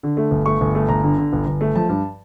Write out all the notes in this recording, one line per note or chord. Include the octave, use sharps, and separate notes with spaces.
D3
A3
G1
A3 C#6
G1
A3
G1 A#5
D3
D3
G1
G1
A3
F3 A5
G2